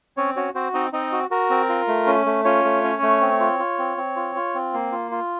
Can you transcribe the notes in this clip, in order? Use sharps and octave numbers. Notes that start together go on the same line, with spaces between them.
C4 C#4 C#5
C#4 F#4 C#5
C4 F#4 C5
C4 D#4 D#5
C4 D#4 D#5
F#4
F#4 A#4
C4
F4
A3
C#4
A3
C#4 F4 C#5
A3
C#4
A3
C4
F4
F4
C4
C4
F4
F4
C4
A#3
F4
F4